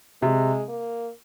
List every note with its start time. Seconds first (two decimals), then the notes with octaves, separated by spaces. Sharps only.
0.22 C3 G#3
0.69 A#3